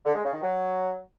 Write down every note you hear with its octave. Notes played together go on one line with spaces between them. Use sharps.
D3
G#3
C#3
D#3
F#3